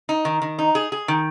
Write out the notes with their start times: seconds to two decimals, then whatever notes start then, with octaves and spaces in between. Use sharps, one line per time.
0.09 D#4
0.25 D#3
0.42 D#3
0.59 D#4
0.75 G#4
0.92 G#4
1.08 D#3